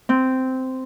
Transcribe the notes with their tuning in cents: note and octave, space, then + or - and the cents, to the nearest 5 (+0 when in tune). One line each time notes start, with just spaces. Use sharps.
C4 -10